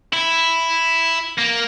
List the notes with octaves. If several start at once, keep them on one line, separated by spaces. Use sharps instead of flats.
E4
A#3